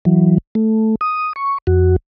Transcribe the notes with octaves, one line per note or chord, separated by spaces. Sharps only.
E3 F#3
A3
D#6
C#6
F2 F#4